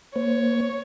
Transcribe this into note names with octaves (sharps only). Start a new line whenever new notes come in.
A#3 C5 C#5